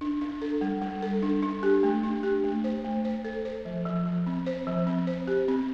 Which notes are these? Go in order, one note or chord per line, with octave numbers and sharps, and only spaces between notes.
D4
D4
A4
G3
G3
A4
D4
D4
G4
A3
D4
G4
A3
C5
A3
C5
A4
C5
F3
F3
F3
C4
C5
F3
C4
C5
G4
C4